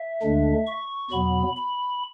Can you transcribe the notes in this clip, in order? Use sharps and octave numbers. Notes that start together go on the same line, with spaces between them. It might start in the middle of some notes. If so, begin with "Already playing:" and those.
Already playing: E5
D2 D3 G#3 D4
C#6
E2 B2 F#3 B3 B5
B5